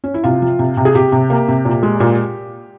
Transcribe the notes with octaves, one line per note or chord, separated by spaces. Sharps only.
C#4
E4
C3 F4
F3
C3
C3
G#4
C3 G4
C3
A#3
C3
A#2
G#3
A#2